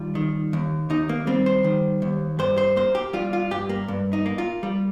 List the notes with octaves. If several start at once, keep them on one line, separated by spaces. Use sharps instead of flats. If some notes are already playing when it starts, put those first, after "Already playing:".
Already playing: D#2 G3 F4
D#3
D#2
D#2 D#4
A#3
G3 C4
C5
D#3
D#2
G2 C5
C5
A#3 C5
G4
G3 F4
F4
G2 G4
A#3
G2
D#4
A#3
F4
G3